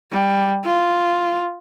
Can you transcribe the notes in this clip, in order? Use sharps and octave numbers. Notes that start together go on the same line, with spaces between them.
G3
F4